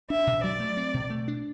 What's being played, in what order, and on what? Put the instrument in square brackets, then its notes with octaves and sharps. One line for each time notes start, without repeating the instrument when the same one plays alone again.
[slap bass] D4 [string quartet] E5
[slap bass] B2
[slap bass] F#3 [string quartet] D5
[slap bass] A3
C4
B2
A3
D4